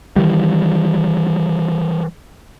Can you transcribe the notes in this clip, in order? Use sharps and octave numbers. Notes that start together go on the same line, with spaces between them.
D#3 E3 G3